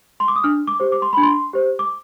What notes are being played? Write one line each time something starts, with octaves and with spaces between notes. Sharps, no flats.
C6
D6
D#6
D4 F6
D6
G4 C5
D6
C6
D4 B5
C6
G4 C5
D6